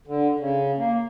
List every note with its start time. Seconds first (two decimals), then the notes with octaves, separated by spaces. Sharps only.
0.07 D3
0.39 C#3
0.78 A#3